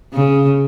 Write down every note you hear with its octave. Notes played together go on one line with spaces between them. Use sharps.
C#3